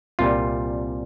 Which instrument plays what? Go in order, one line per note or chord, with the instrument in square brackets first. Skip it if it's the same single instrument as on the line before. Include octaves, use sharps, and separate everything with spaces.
[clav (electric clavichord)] C2 A#2 G3 F4